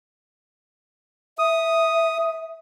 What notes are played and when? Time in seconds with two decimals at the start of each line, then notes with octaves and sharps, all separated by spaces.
1.39 E5 D#6